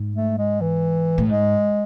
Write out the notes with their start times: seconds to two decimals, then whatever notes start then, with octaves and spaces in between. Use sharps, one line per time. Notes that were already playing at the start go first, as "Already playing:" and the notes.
Already playing: G#2
0.16 A3
0.38 G#3
0.61 E3
1.18 A2
1.29 G#2 G#3